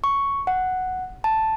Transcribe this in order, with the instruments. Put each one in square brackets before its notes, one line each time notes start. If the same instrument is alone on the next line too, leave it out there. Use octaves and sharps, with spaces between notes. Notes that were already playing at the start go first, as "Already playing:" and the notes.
[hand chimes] C#6
F#5
A5